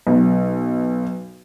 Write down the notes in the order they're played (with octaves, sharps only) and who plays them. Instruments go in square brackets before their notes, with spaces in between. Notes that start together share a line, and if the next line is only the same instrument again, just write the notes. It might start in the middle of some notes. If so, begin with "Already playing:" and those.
[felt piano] B1